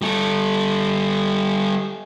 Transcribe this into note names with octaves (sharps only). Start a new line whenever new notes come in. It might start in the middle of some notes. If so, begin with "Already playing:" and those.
G3 A4